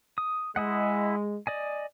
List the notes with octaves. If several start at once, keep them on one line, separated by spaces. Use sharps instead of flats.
D#6
G#3 E4 D#5 F#5
D5 D#5 G#5